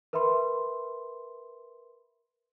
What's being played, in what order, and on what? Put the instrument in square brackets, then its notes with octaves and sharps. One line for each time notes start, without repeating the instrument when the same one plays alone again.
[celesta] A#4 B4 E5 B5 C6